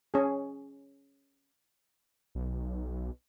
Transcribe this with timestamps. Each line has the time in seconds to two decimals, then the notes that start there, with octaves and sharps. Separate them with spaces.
0.14 C#4 G#4
2.35 B1